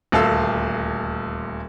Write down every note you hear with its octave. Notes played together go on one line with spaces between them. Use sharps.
D#1 D2 A4 F5 A5 E6